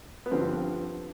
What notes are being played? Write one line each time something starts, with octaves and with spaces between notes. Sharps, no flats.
B3
G2 D3 F3 C4